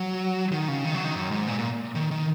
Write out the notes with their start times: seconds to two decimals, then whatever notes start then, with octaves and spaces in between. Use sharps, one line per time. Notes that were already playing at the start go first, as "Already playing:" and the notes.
Already playing: F#3
0.52 D#3
0.68 C#3
0.84 D#3
0.94 F#3
1.05 D#3
1.15 F#2
1.31 G#2
1.47 A#2
1.59 A#2
1.95 D#3
2.11 D#3